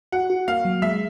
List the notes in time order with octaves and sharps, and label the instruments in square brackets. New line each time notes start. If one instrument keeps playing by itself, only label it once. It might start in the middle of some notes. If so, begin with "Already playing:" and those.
[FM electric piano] F#4 [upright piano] F#5
[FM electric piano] F#4
[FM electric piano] A#3 [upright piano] F5
[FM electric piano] F#3
[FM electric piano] G#3 [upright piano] E5